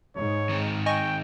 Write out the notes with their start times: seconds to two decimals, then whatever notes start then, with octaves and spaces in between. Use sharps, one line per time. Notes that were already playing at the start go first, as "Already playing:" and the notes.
0.17 G#2 C#5
0.49 D#3 C4
0.86 D#5 G5 G#5 C#6